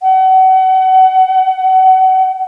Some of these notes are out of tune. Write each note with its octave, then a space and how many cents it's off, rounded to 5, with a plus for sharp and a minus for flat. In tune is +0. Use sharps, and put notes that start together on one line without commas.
F#5 +30